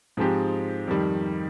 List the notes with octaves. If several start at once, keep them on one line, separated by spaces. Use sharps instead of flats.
G#2 F3 G#3 C4 G4
F2 D#3 G3